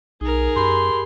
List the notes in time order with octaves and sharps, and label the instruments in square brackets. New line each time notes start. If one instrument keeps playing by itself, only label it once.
[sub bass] B1 [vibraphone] D#4 [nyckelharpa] G#4 A#4
[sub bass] F#2 [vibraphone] G4 B5 [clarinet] C6